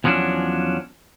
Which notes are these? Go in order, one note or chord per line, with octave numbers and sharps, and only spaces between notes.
E2 F3 F#3 C#4 D4